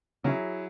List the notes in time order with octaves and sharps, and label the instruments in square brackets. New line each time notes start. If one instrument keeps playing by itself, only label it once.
[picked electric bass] C#3 [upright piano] F#3 E4 G#4